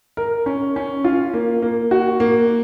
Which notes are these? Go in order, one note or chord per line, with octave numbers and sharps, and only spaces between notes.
A#4
C#4
C#4
F4
A#3
A#3
F#4
A#3